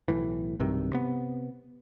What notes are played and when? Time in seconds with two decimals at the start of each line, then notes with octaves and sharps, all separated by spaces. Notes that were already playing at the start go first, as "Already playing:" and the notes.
0.08 B1 A2 E3
0.60 B1 G2 C3 D#3
0.93 C3 B3